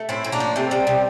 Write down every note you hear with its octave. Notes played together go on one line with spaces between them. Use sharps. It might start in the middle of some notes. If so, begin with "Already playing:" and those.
Already playing: A3
A2 C4 E4
A2
A#3 D4
F3
C3 A3 C4
G3
C3